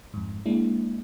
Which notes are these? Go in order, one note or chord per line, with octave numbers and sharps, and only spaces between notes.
F2 G#2
G#3 A#3 D4 E4